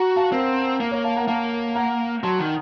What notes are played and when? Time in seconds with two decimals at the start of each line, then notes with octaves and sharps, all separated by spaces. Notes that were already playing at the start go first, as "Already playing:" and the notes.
Already playing: F#4 F#5 A#5
0.16 F5 A5
0.32 C4 A#4
0.80 A#3 A#4
0.91 A#4 C#5
1.04 F5 A5
1.16 F#5 A#5
1.28 A#3 F5 A5
1.75 F#5 A#5
2.23 F#3 A5 C6
2.40 D#3